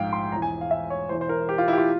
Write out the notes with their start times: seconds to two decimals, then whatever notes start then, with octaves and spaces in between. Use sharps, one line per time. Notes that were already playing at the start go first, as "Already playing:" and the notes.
Already playing: A#1 G#2 F3 F5 G5
0.13 C6
0.32 E1 E2 E3 A#5
0.42 G#5
0.61 F5
0.71 E5
0.90 C#5
1.09 E1 E2 E3 C5
1.21 C5
1.29 A#4
1.49 G4
1.58 F4
1.68 E4
1.73 G4
1.78 F4